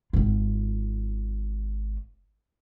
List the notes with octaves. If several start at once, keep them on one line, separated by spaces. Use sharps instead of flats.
G#1 F4